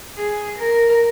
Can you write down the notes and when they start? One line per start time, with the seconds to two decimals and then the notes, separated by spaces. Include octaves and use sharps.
0.17 G#4
0.58 A#4